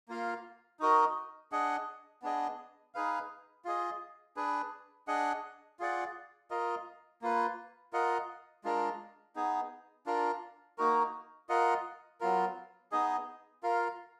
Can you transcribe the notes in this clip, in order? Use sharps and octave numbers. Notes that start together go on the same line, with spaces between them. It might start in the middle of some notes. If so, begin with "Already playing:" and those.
A#3 F4 A#4 F5
D#4 F#4 A#4 D#5
D4 G#4 D#5 F#5
B3 D4 G#4 D#5
D#4 G#4 B4 F5
F4 G#4 D#5
D4 G#4 B4
D4 G#4 D#5 F#5
F4 G#4 D5 F#5
F4 A#4 D#5
A#3 F4 B4
F4 A#4 D#5 F#5
G#3 D4 F4 A#4
B3 D#4 G#4
D4 F4 A#4
A#3 D#4 F#4 A#4
F4 A#4 D#5 F#5
F#3 B3 F4 A#4
B3 D#4 G#4 D#5
F4 A#4 F5